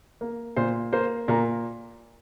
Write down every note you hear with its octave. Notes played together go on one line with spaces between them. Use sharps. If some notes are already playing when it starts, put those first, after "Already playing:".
A#3
A#2 C5
A#3 C5
A#2 A#4